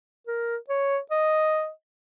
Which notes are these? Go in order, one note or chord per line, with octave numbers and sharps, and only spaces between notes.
A#4
C#5
D#5